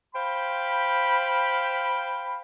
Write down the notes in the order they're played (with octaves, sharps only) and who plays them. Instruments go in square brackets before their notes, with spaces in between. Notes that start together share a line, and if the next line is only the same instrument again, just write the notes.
[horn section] C5 F5 G5 B5